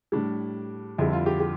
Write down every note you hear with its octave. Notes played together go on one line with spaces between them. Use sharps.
A2 G3 D4
F2 D3 G3 E4
F4
G4
G4